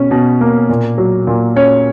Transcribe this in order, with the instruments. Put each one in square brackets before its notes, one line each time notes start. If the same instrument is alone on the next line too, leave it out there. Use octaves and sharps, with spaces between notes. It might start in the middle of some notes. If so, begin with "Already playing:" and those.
Already playing: [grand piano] B2 C#4
B2
A#3
A#2
F#3
A#2
C#4 C#5